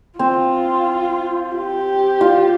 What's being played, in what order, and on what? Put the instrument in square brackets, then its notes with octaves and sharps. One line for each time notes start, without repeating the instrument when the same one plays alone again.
[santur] C4 [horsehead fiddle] F4
[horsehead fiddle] G4
[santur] F4